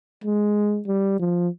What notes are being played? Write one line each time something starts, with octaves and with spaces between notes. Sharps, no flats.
G#3
G3
F3